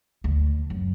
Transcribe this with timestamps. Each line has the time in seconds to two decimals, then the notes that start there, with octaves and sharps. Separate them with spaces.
0.24 D2
0.70 F#2